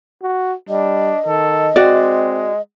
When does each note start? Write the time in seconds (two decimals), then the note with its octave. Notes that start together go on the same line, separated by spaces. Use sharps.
0.22 F#4
0.69 G3 D4 D#5
1.26 D#3 A4
1.76 G#3 C4 F#4 D5